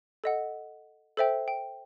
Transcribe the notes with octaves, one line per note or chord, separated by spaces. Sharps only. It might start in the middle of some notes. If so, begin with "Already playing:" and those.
A4 D#5 F#5
A4 C5 E5 G5
G5